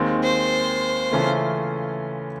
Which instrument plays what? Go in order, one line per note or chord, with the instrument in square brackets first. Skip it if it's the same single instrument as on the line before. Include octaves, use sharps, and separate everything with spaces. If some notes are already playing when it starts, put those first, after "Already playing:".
Already playing: [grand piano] D#2 D#3 G#3 C4
[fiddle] C5
[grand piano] C#3 E3 A3 C#4 F4